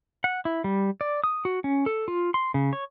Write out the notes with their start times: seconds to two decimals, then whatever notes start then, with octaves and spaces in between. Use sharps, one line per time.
0.24 F#5
0.45 E4
0.64 G3
1.01 D5
1.24 D#6
1.45 F#4
1.64 C#4
1.86 A4
2.08 F4
2.34 C6
2.54 C#3
2.73 C#5